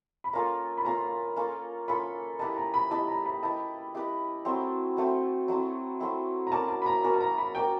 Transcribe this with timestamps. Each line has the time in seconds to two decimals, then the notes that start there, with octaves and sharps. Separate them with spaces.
0.24 B5
0.33 A#3 C#4 F4 A4 A#5
0.77 B5
0.85 A#3 C#4 F4 A4 A#5
1.36 A#3 C#4 F4 A4
1.88 A#3 C#4 F4 A4 B5
2.39 E4 G4 B4 D#5 A5
2.57 A#5
2.74 B5
2.91 E4 G4 B4 D#5 A5
3.08 A#5
3.26 B5
3.43 E4 G4 B4 D#5 A5
3.95 E4 G4 B4 D#5
4.45 F#3 A3 C4 E4
4.97 F#3 A3 C4 E4
5.48 F#3 A3 C4 E4
6.00 F#3 A3 C4 E4
6.47 A#5
6.52 C#4 F#4 A#4 D5 A5
6.68 A5
6.82 B5
6.86 A#5
7.03 C#4 F#4 A#4 D5 A#5
7.14 A5
7.21 A#5
7.38 B5
7.55 C#4 F#4 A#4 D5 G5